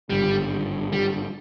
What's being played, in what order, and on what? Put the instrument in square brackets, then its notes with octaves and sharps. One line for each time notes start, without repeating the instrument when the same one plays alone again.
[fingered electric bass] G#1 G2 D3 [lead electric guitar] G3
[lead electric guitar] G3